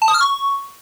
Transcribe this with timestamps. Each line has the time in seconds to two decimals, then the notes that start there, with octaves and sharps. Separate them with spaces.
0.02 A5
0.08 D#6
0.14 F6
0.21 C#6